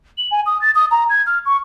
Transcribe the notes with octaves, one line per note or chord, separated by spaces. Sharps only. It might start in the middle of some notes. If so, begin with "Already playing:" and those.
F#7
G#5
D#6
A6
D#6
A#5
G#6
F6
C#6